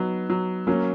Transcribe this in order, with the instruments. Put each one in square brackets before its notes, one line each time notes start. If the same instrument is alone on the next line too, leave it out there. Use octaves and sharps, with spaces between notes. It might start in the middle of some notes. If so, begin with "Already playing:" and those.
Already playing: [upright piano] F#3 [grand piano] B3 D#4
[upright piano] F#3
[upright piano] F#3 [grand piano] A#3 C#4